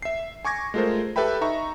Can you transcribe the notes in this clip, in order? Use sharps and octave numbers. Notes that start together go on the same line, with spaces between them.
E5 C7
G#5 C#6 D6 G#6 A#6
G#3 A3 F4 A4 A#4 C5
G4 A4 B4 E5 G5 B5
D#4 E5 A#5 C#6